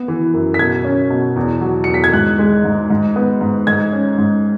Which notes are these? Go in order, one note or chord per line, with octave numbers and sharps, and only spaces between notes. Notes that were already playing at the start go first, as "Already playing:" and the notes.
Already playing: B3
E3
F#2
B6
B2 G#6
C#4
B2
E2
F#3
E2 C#7
B6
G#6
G#2 F#6
G#3
G#2
G#2
B3
G#2
G#2 G#6
C#4
G#2